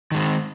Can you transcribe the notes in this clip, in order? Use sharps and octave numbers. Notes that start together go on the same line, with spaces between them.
D#3 G#3 C4